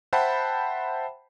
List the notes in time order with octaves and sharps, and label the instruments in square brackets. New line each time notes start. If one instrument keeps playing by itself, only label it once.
[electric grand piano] C5 E5 F#5 G5 A5 B5